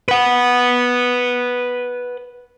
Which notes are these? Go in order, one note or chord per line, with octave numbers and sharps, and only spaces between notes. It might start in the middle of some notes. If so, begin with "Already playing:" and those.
B4 F#5